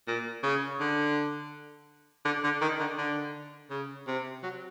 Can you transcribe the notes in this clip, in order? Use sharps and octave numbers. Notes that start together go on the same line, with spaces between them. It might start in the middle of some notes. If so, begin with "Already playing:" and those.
A#2
C#3
D3
D3
D3
D#3
D3
D3
C#3
C3
F#3